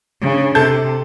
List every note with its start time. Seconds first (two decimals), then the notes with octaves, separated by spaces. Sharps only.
0.21 C#3 D4
0.55 C3 A4 A5 G6